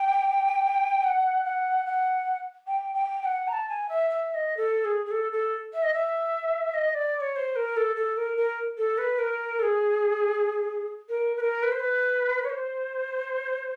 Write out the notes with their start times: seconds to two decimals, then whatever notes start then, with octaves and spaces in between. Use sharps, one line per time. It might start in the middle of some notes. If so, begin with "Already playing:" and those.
Already playing: G5
1.03 F#5
1.44 F#5
1.85 F#5
2.66 G5
2.94 G5
3.21 G5
3.24 F#5
3.47 A#5
3.52 A5
3.68 G#5
3.88 E5
4.09 E5
4.29 E5
4.34 D#5
4.56 A4
4.84 G#4
5.05 G#4
5.10 A4
5.32 A4
5.72 E5
5.82 D#5
5.92 E5
6.73 D#5
6.94 D5
7.15 D5
7.20 C#5
7.35 C5
7.55 A#4
7.76 A4
7.95 A4
8.16 A#4
8.36 A#4
8.77 A4
8.97 B4
9.18 A#4
9.58 A4
9.62 G#4
11.08 A#4
11.36 B4
11.40 A#4
11.62 B4
11.71 C5
11.79 B4
12.44 C#5
12.49 C5